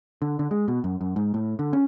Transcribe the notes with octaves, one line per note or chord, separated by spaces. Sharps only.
D3
D3
G#3
B2
F#2
F#2
G#2
A2
D3
C#4